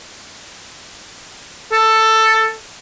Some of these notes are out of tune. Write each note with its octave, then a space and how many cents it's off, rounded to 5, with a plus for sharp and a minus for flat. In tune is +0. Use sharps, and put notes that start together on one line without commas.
A4 +10